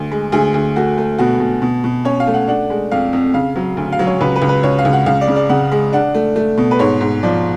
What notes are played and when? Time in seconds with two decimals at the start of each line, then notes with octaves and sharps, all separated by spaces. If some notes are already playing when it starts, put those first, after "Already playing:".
Already playing: D2
0.11 G#3
0.32 D2 G#4
0.54 D2
0.76 A3 F#4
0.98 A3
1.18 B2 F#4
1.40 B2
1.62 B2
1.84 B2
2.05 C#4 C#5
2.20 F5
2.27 A3
2.34 F#5
2.48 D4 F#5
2.70 G#3
2.91 F2 F5
3.13 F2
3.34 C#3 F5
3.56 F#3
3.77 D2
3.92 F5
3.99 F#3
4.07 C#5
4.21 C#2 B4
4.36 B4
4.42 C#2
4.49 B4
4.63 C#2 C#5
4.79 F5
4.85 C#2
4.93 F#5
5.06 C#2 F5
5.21 D5
5.28 C#3
5.36 D5
5.49 C#3 F#5
5.72 G#3
5.93 D4 F#5
6.14 A3
6.36 A3
6.57 B2
6.71 B4
6.79 G#2 C#5
7.01 G#2
7.23 F3 D5